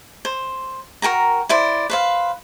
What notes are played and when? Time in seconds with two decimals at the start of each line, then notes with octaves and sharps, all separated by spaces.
0.25 C5
1.02 F#4 A#4 G5 A#5
1.49 E4 C5 D5
1.90 B4 C5 F5